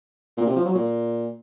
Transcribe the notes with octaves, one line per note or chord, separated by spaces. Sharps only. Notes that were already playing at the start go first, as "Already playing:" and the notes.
A#2
C3
F3
F#3
A#2